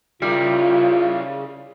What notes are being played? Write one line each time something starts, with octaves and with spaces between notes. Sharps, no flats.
C#3 G3 E4 F4 A#4